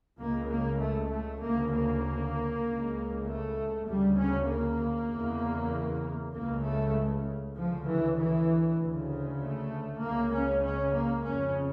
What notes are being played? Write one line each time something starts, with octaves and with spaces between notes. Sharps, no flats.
C#2 C#3 A#3
A#3
A3
A3
D2 C#3 A#3
A#3
C#2 C#3
A3
D2 C#3 G3
C#4
A#3
E2 C#3
C#2 C#3 A#3
A3
D2 C#3 F3
E3
E3
D2 C#3
A3
C#2 C#3 A#3
C#4
C#4
A#3
F2 C#3 C#4